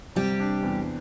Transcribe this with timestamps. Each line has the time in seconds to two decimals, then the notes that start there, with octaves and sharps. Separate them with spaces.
0.16 C3 G3 G4
0.40 D4
0.63 E2